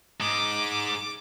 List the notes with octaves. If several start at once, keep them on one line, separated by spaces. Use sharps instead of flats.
G#2 G#3 D6